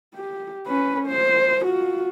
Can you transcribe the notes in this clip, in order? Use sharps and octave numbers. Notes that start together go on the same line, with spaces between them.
G4
C#4 B4
C5
F4 F#4